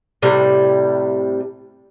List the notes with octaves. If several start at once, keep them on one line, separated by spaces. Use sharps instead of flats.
A2 C3 G3